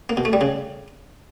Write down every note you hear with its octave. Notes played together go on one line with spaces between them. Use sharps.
A#3
B2
A3
G3
C#3